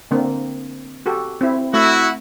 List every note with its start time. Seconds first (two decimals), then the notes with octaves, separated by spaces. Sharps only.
0.11 D3 A#3 C4
1.06 F#4 G4 A4
1.41 C4 E4
1.74 A3 E4 F#4